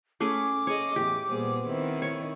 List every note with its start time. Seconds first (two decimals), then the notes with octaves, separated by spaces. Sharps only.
0.20 A3 C#4 G#4 D6
0.67 G#4 C#5 D#5
0.96 E2 A2 G4
1.29 A#2 G3 B3 G#4 C5
1.68 D#3 C4 E4
2.02 C#5